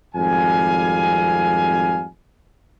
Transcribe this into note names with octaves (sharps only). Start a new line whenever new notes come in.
G#1 F2 G3 F5 G#5